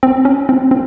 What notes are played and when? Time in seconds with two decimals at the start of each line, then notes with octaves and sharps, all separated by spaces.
0.03 C4
0.25 C#4
0.49 C4
0.71 C4